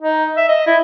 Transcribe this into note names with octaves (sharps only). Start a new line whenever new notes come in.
D#4
E5
D#5
E4